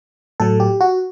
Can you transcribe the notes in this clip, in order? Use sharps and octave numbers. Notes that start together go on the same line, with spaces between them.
A2 F#3 A4
G4
F#4